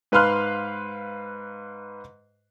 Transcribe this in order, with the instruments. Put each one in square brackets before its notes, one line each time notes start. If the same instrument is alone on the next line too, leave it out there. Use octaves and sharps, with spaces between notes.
[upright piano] G#2 B4 F5 C6 F6 F#6